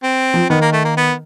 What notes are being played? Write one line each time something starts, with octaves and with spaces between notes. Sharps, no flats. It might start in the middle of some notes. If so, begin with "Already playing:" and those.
C4
F3
D#3 B3
A#3
A3
A#3
B3